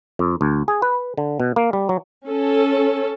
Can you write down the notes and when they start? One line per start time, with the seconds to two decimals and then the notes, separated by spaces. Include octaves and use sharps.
0.19 F2
0.41 D2
0.68 G#4
0.82 B4
1.18 D3
1.40 B2
1.56 A#3
1.73 G3
1.89 F#3
2.28 C#4 A4